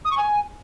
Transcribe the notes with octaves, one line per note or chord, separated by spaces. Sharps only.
D#6
C#6
G#5